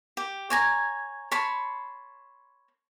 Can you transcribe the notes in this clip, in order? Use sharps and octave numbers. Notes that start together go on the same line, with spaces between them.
G4
C#5 G#5 A#5
C#5 A5 B5 C6